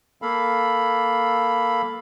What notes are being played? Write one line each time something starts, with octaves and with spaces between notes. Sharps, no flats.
A#3 A4 F5 B5